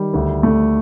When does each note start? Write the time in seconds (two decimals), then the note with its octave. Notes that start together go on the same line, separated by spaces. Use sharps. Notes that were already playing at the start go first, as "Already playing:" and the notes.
Already playing: D#3 G3
0.14 D2
0.43 A3